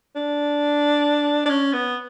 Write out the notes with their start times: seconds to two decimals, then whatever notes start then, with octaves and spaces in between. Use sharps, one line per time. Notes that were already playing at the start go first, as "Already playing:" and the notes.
0.16 D4
1.46 D4
1.50 C#4
1.73 B3